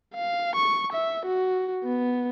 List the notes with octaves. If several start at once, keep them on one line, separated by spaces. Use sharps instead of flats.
F5
C#6
E5
F#4
B3